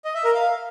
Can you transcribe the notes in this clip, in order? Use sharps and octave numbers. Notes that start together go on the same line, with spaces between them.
D#5
E5
A#4
F5